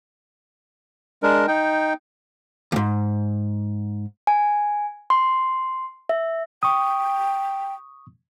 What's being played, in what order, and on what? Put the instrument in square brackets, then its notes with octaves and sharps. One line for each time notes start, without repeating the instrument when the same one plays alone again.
[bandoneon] G#3 D4 A#4
D#4 G5
[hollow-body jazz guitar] D#2 G#2
[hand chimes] G#5
C6
E5
[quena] G5 [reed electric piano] C#6 D#6